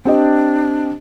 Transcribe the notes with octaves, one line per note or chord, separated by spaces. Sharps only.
C4 D4 G4 D#5